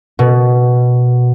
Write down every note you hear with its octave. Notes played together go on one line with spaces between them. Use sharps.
B2